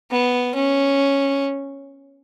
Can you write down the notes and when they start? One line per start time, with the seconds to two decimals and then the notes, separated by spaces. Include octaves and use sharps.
0.11 B3
0.55 C#4